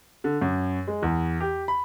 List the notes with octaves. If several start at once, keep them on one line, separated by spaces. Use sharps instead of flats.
D3
F#2
G#3
E2
G4
B5